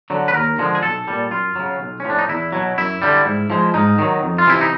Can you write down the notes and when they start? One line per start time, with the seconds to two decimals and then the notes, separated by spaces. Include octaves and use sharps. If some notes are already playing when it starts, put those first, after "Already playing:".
0.10 D3 F#3
0.28 B4
0.34 D#2 A#4
0.59 D3 F3 G#3
0.75 G#4
0.83 B1 A4
1.08 A#2 G3
1.31 F#2 F4
1.56 C#3 F#3
1.80 B1
2.00 A2 F3 C#4
2.10 D4
2.18 D#4
2.29 E2 E4
2.52 B2 F#3
2.78 F#2 E4
3.02 D3 G3
3.26 G#2
3.50 F3 G#3
3.74 G#2 D#4
3.98 D#3 F#3
4.23 F2
4.38 F4
4.47 C3 E3 E4
4.61 D#4